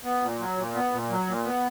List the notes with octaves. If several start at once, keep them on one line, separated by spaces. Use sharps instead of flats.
B3
A#2
F#3
A#2
B3
A#2
F#3
A#2
B3